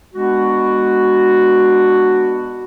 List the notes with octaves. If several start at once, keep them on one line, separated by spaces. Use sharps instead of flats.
G#3 B3 D4 F#4